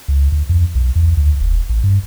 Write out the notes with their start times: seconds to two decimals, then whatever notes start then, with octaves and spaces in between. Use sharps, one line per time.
0.08 C#2
0.32 D2
0.49 F2
0.75 B1
0.96 E2
1.17 D2
1.40 E1
1.69 A1
1.84 G2